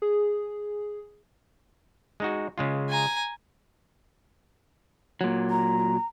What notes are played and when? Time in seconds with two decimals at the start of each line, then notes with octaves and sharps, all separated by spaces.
0.02 G#4
2.20 G#3 D#4 F#4
2.58 C#3 G#3 F4
2.90 G#5 A#5
5.21 A#2 F#3
5.50 A#5